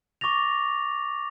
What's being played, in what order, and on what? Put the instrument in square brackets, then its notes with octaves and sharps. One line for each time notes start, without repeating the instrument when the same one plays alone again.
[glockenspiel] C#6 D6 A6 A#6 F7